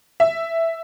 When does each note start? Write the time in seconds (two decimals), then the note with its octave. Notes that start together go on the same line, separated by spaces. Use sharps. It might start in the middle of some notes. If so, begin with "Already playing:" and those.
0.20 E5